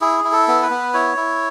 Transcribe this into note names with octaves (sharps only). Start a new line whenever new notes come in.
E4 G#4
E4
A4
B3
B4
B3
E4 C#5
E4